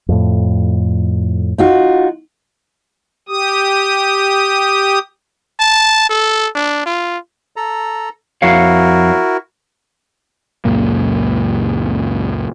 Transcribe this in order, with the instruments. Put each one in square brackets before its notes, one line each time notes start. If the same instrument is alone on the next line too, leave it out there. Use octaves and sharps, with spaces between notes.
[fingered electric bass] F2 A2
[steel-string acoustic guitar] D#4 F4 F#4
[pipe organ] G4 D#6
[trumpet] A5
A4
D4
F4
[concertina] A4 A#5
[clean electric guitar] F2 C#5 F5 [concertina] E4 F#4 A#4
[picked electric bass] C#2 F#2 A#2 A#3